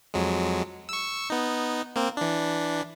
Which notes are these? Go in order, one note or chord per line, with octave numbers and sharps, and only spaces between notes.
F2 F#3 G#3
C#6 E6
B3 D#4
A#3 C4
E3 D4